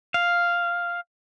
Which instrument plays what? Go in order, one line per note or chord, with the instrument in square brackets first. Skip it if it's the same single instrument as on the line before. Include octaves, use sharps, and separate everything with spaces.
[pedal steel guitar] F5